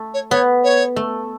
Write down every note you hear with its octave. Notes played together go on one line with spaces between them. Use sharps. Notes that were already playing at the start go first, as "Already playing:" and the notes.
Already playing: A3
C#5
B3 C#5
C#5
A3